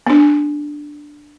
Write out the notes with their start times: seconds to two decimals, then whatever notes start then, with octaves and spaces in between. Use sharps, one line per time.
0.07 B3 D4